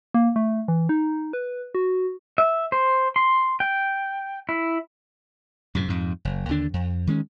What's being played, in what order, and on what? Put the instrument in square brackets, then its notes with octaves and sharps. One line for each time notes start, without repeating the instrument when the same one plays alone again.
[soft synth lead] A#3
A3
E3
D#4
B4
F#4
[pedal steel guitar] E5
C5
C6
G5
E4
[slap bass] F#2 A2 C3
F2 G#2
F#1
D#2 D3 D4
F2
D#3 G#3 C#4